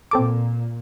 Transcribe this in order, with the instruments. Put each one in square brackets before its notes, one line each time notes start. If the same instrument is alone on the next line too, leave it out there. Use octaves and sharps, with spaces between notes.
[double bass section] A#2 [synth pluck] C4 A4 D6